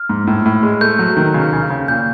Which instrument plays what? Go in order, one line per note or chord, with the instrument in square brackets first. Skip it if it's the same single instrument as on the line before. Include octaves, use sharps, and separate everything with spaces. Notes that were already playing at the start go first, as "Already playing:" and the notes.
Already playing: [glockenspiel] F6
[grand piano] G#2
A2
A2
G#3
[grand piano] A3 [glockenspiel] G6
[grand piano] F#3
D#3
C#3
C#3
C#3
[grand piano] A#2 [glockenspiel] G6